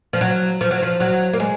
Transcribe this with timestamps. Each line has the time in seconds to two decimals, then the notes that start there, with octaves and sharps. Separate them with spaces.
0.13 F3
0.21 F#3
0.61 F3
0.71 F#3
0.82 F3
1.00 F#3
1.33 A#3
1.40 G#3